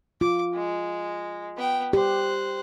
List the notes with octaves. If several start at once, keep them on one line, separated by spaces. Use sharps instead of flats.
F4 D6
G#3
B3 G5
G4 C5 F#6